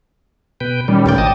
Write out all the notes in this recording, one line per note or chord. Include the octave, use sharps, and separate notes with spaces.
B2 B4 G5
A#2 D#3 G3 C#4
D2 C#5 D5 G5
G#1 D#5 A5 D#6